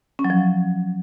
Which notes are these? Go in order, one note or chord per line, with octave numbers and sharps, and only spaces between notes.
C#4
F#3
F3